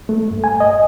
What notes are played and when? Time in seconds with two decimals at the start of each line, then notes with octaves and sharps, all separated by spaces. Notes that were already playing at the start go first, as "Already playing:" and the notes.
0.09 A3
0.31 G2
0.44 G#5
0.60 D#5